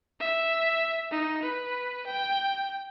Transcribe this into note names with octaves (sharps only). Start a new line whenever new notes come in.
E5
D#4
B4
G5